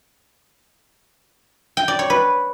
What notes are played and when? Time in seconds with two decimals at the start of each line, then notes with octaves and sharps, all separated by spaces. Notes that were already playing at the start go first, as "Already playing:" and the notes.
1.77 G5
1.88 D5
1.99 C#5
2.10 B4